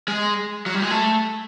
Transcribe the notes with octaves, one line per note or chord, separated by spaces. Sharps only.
G#3
F#3
G3
G#3
A3